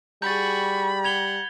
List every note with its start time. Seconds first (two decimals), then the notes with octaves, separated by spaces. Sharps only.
0.22 G3 F#4 G#4 B5 G6 A6
1.04 F#5 G#6 F7 G7